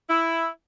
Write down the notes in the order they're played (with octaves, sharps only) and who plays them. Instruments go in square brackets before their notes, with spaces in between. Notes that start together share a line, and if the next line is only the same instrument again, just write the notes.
[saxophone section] E4